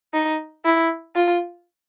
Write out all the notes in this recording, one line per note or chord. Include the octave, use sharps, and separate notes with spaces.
D#4
E4
F4